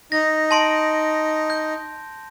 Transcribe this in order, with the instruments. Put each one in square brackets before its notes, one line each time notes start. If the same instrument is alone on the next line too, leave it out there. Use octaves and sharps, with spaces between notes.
[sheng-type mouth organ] D#4 [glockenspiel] A#6
[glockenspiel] A5 C6 D7
G6